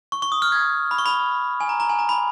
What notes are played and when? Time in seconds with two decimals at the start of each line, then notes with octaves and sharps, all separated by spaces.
0.12 C#6
0.22 C#6
0.32 D#6
0.42 F6
0.52 G#6
0.91 B5
0.98 C#6
1.06 B5
1.60 G#5
1.69 A#5
1.80 A#5
1.89 G#5
1.99 A#5
2.09 B5